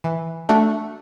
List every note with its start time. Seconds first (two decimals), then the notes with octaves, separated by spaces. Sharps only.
0.04 E3
0.49 A3 D4 F#4